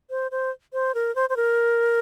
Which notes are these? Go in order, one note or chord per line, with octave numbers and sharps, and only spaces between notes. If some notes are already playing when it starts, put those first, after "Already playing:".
C5
C5
C5
A#4
C5
C5
A#4